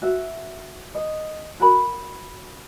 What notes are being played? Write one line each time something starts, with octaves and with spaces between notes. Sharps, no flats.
F#4 E5
D#5
F#4 A#4 B5